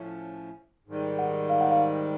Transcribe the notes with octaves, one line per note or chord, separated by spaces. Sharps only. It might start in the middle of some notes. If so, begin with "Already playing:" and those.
Already playing: A2 F3 A3 C#4
G#2 D#3 G3
F#5
F5
F#5
F5